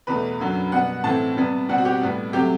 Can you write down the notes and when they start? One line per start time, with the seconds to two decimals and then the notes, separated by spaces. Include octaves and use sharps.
0.07 E2 B2 A3 B4
0.40 F#2 D3 F#3
0.72 B2 G3 B3 F#5
1.04 A2 E3 A3 C4 A5
1.37 C3 G3 B3
1.69 B2 G3 C4 F#5
1.78 F#4
1.85 G4
2.02 A2 G3 B3
2.33 C3 F#3 A3 G4